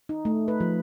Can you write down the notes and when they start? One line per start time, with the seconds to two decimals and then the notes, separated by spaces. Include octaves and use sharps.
0.09 D#4
0.25 A3
0.48 B4
0.60 F3